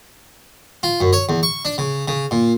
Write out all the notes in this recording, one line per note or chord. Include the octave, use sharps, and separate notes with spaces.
F4
F#2
C#5
E2
C#6
D4
C#3
C#3
A#2